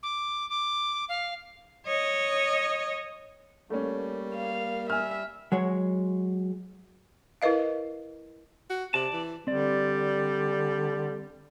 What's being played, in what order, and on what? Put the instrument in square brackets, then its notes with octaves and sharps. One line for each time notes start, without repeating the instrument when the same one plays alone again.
[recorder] D6
D6
F5
[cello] C#5 D#5
[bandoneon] G3 [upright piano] A3 C#4 [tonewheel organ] A#3
[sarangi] F5
[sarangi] E5 [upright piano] G#5 F6
[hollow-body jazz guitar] F#3 G#3 C#5
[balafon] E4 A#4 B4 D#5 F5
[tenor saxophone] F#4
[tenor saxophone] C3 [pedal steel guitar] D5 A5
[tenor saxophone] E3
[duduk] D3 [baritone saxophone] G3 [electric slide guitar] C4 D5